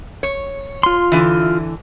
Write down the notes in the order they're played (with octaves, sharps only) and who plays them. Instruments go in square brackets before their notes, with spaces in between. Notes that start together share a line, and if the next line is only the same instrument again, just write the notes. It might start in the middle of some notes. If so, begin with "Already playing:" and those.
[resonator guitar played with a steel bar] C#5
[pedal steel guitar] F4 C6
[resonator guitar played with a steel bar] D3 E3